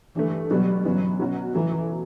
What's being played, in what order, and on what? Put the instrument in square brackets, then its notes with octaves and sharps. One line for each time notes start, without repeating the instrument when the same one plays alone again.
[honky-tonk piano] G2 D3 A3 [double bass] E3
[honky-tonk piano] B2 G3 B3 [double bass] F#3
[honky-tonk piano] G1 F#2 E3 B3 [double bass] F#3
[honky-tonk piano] B2 F#3 C#4 F#4
[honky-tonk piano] F#2 C#3 F#3 A3 E4 [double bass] E3